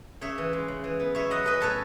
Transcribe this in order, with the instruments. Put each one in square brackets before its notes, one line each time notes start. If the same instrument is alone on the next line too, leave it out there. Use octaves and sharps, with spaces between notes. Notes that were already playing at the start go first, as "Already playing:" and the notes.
[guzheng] C#3 C#5 E5
E3
G#3
C#3
E3
B3
B2 C#5 E5
F#3 D#5 F#5
C#4 B4 D#5
A2 A4 C#5